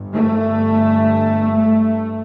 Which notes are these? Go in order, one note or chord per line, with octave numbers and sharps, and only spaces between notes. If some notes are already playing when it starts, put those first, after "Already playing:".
Already playing: G1 G2
A3
A3